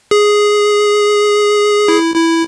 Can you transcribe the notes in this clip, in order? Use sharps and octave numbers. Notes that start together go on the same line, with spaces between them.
G#4
E4
E4